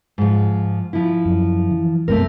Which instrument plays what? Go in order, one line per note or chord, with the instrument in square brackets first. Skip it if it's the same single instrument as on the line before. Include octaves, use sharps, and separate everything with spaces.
[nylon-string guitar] G#2 F3
F3 E4
[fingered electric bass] F#2
E3
[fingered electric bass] A#1 F#2 B2 [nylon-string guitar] A3 C4 A#4